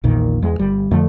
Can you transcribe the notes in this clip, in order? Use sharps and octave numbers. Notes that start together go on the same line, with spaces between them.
A#1 E2 A#2 D#3
E2 G#3
G1 G3
F2 D3 F3 A3